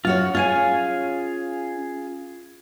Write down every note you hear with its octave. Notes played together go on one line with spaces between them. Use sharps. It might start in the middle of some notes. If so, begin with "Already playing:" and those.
F#2 F4 F#4 C#5
C#4 F4 G#4 F5 G#5